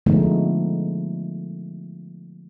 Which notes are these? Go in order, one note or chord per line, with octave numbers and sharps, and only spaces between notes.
D3 F3 G#3 A3 B3 D#4